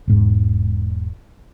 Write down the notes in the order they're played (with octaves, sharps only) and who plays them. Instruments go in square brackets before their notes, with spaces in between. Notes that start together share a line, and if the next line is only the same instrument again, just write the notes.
[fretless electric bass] E1 G#2